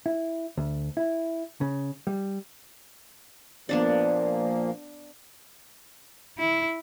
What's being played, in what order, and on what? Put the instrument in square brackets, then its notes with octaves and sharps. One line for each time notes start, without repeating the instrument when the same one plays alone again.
[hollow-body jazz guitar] E4
D2
E4
C#3
G3
[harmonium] A#2 F3 A#3 [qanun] B3 D4 D5
[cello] E4